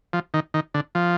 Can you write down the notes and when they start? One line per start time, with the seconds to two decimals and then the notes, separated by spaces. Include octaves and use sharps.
0.13 F3
0.34 D#3
0.54 D#3
0.74 D3
0.95 F3